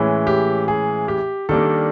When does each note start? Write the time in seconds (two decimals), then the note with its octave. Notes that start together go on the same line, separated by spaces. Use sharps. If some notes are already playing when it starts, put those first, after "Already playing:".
Already playing: A2 E3 G#3 C#4
0.27 G4
0.68 G#4
1.08 G4
1.49 D#3 G3 A#3 D4 A4